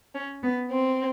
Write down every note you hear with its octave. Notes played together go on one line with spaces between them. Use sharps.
C#4
B3
C4